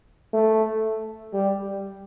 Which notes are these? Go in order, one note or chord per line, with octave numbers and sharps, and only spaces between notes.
A3
G3